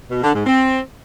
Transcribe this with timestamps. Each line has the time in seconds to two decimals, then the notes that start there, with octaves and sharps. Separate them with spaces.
0.10 B2
0.22 D3
0.34 G#2
0.46 C4